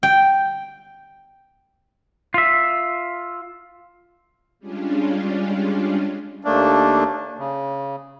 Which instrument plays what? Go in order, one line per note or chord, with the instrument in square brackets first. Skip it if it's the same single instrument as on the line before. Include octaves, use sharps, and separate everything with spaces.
[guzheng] G5
[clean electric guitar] F4 E5
[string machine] G3 G#3 C#4 D4 F4
[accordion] D#2 A3 A#3 D4
C#3